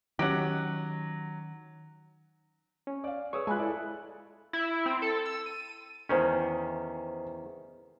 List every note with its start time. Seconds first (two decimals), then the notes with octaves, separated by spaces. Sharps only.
0.19 D#3 F#3 C#4 G4 F#5
2.87 C#4
3.04 D5 F5
3.33 G#4 B4 C#5 C#6 D#6 E6
3.47 G#3 F4 G#5 B5 F#6
3.59 E4 A4 D5
4.53 E4
4.86 C4
5.02 A4
5.26 E6
5.46 D#7
6.09 E2 D#3 C#4 C5